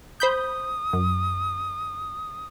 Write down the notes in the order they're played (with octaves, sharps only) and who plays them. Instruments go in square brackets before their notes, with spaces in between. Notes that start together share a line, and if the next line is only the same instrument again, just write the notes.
[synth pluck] C5 B5 G6 [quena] D#6
[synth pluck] F#2